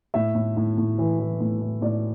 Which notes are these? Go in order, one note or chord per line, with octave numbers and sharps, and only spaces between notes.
A2 E5
A2
A2
A2
E3
E3
A2
A2
A2 D5